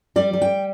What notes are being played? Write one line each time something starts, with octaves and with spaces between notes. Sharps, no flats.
G3 D5
G3
G5